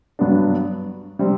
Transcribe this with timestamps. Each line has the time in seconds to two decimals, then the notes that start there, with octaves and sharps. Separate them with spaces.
0.19 G2 F#3 B3 D4
1.19 C3 G3 C4